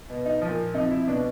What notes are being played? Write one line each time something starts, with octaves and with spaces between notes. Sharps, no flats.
B2
D#4
A#2 F3
C3 F3 D#4
E4
B2 D4